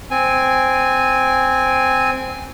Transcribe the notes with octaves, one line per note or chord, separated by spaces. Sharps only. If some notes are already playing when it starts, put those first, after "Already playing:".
C4 G#5